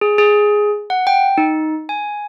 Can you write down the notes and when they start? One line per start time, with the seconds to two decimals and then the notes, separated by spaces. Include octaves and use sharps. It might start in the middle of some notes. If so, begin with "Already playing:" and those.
0.01 G#4
0.18 G#4
0.90 F#5
1.07 G5
1.38 D#4
1.89 G#5